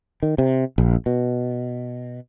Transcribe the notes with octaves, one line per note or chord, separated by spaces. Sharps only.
D#3
C3
A#1
B2